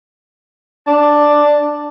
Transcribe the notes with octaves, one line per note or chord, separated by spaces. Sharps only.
D4 A5